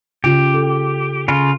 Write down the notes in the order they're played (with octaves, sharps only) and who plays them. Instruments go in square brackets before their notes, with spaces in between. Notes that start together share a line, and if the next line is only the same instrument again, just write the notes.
[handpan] C#3 F4 [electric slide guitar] G4
[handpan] A4
[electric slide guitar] C#3 F4